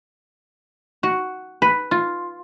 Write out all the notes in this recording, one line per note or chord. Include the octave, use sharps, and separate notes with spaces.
F#4
B4
F4